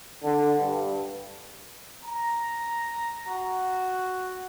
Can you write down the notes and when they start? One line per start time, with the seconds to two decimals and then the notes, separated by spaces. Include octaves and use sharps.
0.24 D3
0.58 G2
2.02 A#5
3.27 F#4